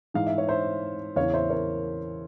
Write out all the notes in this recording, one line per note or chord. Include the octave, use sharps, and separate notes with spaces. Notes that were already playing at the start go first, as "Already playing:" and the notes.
G#2 E3 F5
E5
C#5
C5 E5
E2 C#3 E3 C#5 F5
C5 E5
A#4 C#5